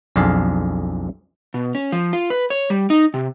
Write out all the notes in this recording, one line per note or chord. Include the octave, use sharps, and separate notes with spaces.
B1 F2 D4 F4 G#4 F5
B2
C#4
F3
F4
B4
C#5
G3
D#4
C3